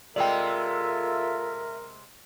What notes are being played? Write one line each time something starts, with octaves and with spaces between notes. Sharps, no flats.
C3 G#3 F4 A4 A#4 D5 E5 G5